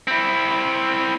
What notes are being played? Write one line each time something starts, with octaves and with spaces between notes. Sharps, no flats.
C4 E4